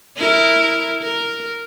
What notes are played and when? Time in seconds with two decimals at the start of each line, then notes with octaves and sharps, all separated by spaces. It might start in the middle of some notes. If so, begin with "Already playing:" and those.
0.17 E4 A#4
1.02 A#4